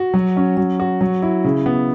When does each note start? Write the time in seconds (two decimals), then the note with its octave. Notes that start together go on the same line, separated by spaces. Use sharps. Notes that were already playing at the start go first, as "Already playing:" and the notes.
Already playing: F#4
0.14 F#3
0.37 C#4
0.57 F#3
0.80 F#4
1.01 F#3
1.22 E4
1.44 C#3
1.66 B3